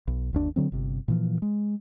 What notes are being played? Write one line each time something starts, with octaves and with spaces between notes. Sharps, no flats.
B1
G1 D#2 D4
D3 F#3 C4
G1 C3
A#2 E3 F3
G#3